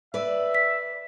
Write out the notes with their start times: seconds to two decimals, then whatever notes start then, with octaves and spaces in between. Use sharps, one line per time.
0.14 B4 D5 E5
0.55 B6